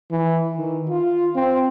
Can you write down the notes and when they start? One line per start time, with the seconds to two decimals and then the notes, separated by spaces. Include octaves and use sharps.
0.11 E3
0.57 D#3
0.89 F4
1.35 C4